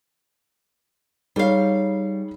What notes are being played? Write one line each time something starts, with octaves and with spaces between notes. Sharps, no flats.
G3 D#4 G#4 C#5 F5